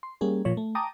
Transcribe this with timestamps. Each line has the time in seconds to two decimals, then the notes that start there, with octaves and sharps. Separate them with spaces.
0.03 C6
0.21 G3 A#3 C#4 G#4
0.45 A#2 F3 C#5
0.57 A3
0.75 G5 A5 A#5 D6 D#6